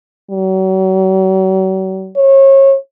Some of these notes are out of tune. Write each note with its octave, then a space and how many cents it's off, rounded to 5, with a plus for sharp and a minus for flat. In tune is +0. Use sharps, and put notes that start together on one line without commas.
F#3 +40
C#5 -30